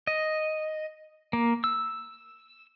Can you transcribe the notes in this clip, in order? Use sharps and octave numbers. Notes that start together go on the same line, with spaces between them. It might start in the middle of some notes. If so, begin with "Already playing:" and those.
D#5
A#3
E6